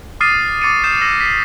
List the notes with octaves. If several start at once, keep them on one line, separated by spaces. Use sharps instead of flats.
D6 D#6 F6 A6 C7 D#7
C#6 D6 A6 C#7 D#7
D#6 G6 C7 E7
E6 A#6
B6 C7